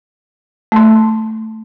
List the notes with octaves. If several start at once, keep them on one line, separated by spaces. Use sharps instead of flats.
A3 C6